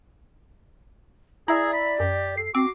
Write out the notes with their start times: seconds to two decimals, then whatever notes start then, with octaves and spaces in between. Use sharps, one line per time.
1.48 E4 G#4 D5 E5 A#5
1.73 B5
2.00 F#2 G4
2.37 A4 C7
2.55 C4 F#4 D6